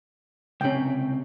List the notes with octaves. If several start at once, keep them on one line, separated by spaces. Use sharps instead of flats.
C#2 C3 C#4 G5